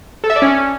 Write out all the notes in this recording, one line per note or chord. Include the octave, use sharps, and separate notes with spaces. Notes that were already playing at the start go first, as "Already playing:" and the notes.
A4
E5
D5
C#4